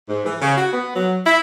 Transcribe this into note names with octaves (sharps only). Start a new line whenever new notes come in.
G#2
E3
C#3
F#4
B3
F#3
E4